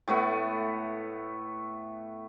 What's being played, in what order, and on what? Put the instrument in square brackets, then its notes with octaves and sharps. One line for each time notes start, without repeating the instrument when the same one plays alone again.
[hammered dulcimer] A2 A3 B3 F#5